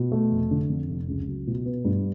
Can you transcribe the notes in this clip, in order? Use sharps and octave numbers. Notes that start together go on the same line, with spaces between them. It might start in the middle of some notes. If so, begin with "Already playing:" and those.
Already playing: B2
A3
F1
D3
F2
F1
C#2
F#3
B2
B3
G2